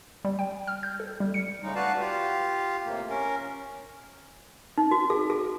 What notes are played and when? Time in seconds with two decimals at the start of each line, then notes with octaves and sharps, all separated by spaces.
0.25 G3
0.39 G5
0.67 F6
0.83 G6
1.00 A4
1.20 G3
1.34 C#7
1.63 A2 C#3 G#3 D#4
1.75 F#4 B4 D5 F5 A5
2.00 F4 G4 F5
2.86 A2 C3 A#3
3.10 C#4 A#4
4.78 D#4
4.91 F#4
5.10 G#4
5.30 G#4